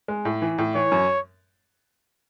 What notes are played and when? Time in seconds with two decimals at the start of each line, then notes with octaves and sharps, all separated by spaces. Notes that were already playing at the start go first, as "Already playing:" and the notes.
0.08 G#3
0.25 A2
0.42 E3
0.58 A2
0.75 E3 C#5
0.92 F#2